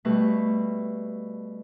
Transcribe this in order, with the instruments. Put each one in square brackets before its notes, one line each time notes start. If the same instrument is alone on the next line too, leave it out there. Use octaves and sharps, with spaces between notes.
[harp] B2 G3 A3 B4